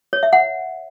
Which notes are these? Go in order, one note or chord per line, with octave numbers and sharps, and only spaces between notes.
C#5
E5
F#5